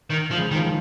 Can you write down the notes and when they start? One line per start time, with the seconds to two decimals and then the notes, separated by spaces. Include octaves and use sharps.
0.10 D#3
0.31 F3
0.37 C#2 C#3
0.51 D#3
0.55 F3
0.64 D#3